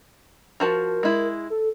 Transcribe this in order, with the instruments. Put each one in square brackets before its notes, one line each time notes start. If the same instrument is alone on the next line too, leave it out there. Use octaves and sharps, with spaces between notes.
[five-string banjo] F3 F#4 A5 [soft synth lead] A#4
[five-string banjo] G#3 E4
[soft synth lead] A4